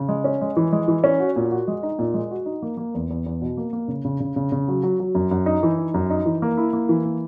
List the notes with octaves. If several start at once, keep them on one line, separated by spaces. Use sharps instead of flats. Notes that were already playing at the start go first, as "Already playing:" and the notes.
Already playing: C#3
G#3
C#4
G#3
E3
G#3
E3
C#4
F#4
A#2
F#4
G#3
D#4
A#2
G#3
F#4
D#4
A#3
A#3
E2
E2
E2
B2
A#3
A#3
C#3
C#3
C#3
C#3
C#3
F#3
F#3
F#3
F#2
F#2
D#4
E3
D#4
F#2
D#4
E3
A#3
E4
A#3
E3
A#3